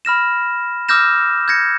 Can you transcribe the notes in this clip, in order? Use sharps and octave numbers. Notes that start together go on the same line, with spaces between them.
B5 F6 A#6 E7
D6 E6 F6 G6 A#6 E7
G6 G#6 A#6 C#7